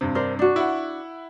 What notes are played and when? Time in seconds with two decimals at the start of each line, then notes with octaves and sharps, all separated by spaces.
0.01 G2 C3
0.15 D4 A#4 C5
0.39 D4 F#4
0.56 E4 F#5